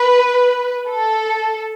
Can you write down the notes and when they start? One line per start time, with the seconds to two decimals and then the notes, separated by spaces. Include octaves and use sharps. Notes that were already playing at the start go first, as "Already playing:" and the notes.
Already playing: B4
0.88 A4